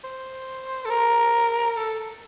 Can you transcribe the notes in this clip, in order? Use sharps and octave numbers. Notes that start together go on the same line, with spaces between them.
C5
A4
A#4
A4